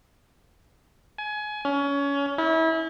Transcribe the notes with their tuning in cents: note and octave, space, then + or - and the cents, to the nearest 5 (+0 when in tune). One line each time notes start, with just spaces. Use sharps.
G#5 +25
C#4 +25
E4 -30